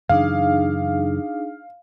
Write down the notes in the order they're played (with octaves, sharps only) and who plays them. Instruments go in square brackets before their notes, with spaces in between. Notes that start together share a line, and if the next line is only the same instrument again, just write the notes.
[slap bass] F#2 C#3 E3 [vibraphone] D4 D#4 G#4 [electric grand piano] F5